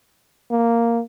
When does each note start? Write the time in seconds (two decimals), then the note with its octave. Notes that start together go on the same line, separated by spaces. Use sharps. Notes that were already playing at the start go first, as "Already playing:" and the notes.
0.51 A#3